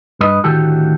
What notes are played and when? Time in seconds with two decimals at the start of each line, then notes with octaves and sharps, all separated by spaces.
0.21 G2 B4 D#5
0.44 D2 A2 D#3 F#4 G4 A4